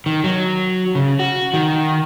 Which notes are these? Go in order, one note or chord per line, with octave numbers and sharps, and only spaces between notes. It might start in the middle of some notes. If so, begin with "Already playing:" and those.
D#3
F#3
C#3
F#4
D#3